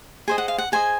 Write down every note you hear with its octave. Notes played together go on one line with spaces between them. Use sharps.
G#4 C5 D#5 G#5
F#5
F5
F#5
G#4 C5 D#5 G#5